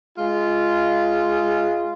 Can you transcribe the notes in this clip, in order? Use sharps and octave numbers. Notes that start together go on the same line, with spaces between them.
G#3 F4